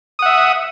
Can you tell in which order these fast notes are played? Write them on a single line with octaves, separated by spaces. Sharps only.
D#6 F#5 E5